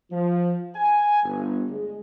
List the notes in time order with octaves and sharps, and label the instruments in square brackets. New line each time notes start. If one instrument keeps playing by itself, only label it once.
[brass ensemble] F3
G#5
G1
G#3